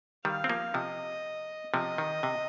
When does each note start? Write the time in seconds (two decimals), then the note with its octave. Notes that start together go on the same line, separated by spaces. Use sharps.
0.25 D#3 G3 F5
0.44 C4
0.49 F3 A#3
0.74 C3 F3 D#5
1.74 C3 F3 D#5
1.98 D#3
2.23 C3